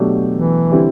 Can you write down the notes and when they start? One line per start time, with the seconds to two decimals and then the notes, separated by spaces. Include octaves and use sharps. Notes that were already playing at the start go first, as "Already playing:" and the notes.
Already playing: B2 F#3 A3 D4 G4
0.32 E3
0.71 D3 G3 C4 E4